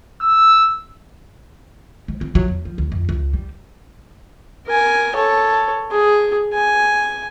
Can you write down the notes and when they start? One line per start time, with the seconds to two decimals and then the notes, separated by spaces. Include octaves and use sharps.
0.21 E6
2.08 G#3
2.21 C4
2.35 F#3
2.48 E2
2.65 F3
2.78 D2
2.92 F2
3.09 C#2
3.34 G3
4.67 A#4 G#5
5.15 A4 C#5
5.91 G#4
6.53 G#5